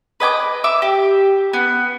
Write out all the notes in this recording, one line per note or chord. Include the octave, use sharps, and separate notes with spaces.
B4 D#5 G#5 D6
E5 D6
G4
B3